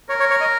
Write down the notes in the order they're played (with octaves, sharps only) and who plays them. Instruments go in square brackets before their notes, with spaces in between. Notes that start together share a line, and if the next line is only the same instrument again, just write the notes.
[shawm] A#4 [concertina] C#5
[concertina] C#5
C#5
D#5